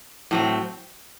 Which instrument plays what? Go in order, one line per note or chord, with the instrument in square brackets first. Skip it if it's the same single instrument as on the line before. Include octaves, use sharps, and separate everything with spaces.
[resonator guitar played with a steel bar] A2 F#3 C4